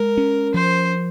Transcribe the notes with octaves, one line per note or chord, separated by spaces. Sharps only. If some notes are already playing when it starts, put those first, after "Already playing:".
Already playing: G#3 A#4
C#4
F3 C5